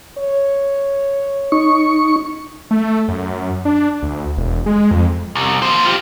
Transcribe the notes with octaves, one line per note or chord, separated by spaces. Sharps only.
C#5
D#4 C#6
A3
F#2
D4
D2
E1
G#3
F2
C2
A#3 C5
F4 G4